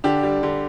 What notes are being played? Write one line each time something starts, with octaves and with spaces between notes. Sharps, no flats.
D3 D4 G4
G3
D3